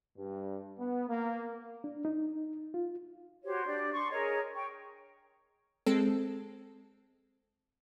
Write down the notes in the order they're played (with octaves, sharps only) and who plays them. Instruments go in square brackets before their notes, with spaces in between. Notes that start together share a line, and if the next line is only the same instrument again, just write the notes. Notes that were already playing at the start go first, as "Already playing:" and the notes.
[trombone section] G2
B3
A#3
[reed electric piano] D4
D#4
F4
[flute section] F#4 G4 C5 C#5
D4 G4 D5
D4 C6 C#6
G#4 A#4 C#5 D#5
G5 C#6
[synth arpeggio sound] G#3 C4 A4